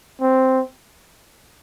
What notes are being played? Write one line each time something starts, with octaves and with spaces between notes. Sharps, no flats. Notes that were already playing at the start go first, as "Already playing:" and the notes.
C4